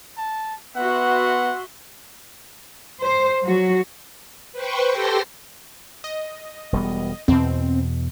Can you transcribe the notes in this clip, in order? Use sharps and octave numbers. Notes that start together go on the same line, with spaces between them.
A5
B3 F#4 E5 F#5 C6
C5
F#3 F#4
B4 C5 G5 C#6
G4 A4 C6 A#6 C7
D#5
E1 G3 B3
E2 B2 C4